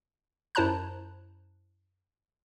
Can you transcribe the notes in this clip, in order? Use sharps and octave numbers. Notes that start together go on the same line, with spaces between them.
F#2 E4 C5 A5 A#5 F#6